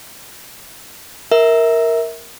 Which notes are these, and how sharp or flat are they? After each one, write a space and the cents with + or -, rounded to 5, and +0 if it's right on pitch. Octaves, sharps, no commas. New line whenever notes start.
A#4 +0 E5 -25